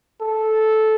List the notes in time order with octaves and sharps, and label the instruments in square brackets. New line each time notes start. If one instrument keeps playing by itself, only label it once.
[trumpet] A4